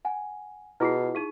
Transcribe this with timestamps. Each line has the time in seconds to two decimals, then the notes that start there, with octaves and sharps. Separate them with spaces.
0.05 F#5 G#5
0.80 B2 E4 F4 G#4 F6 C7
1.15 D#4 G#4 F5 C#6 D#7